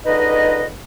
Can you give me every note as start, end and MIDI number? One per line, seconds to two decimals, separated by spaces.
0.06 0.67 37
0.06 0.67 50
0.06 0.67 63
0.06 0.67 71
0.06 0.67 75